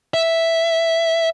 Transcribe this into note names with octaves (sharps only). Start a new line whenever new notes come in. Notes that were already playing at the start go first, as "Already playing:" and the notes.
E5